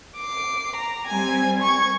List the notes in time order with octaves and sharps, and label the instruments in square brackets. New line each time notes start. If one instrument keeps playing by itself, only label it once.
[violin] D6 C7
A#5
[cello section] G3 C4 [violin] G#5
[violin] C#6 G#6